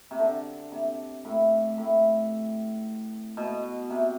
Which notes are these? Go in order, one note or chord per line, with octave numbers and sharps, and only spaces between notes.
C3
D3
C3
A2
A2
B2
C3